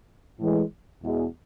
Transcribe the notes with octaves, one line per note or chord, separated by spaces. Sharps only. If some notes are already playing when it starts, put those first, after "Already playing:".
A2 E3 G#3
E2 B2 G#3